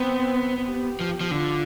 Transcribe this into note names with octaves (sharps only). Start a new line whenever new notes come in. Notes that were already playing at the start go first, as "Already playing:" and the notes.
Already playing: B3 C4
G4
F3
F3
D3 F4